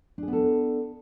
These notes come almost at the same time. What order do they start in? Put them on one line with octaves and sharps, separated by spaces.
D4 G#4 B3 A4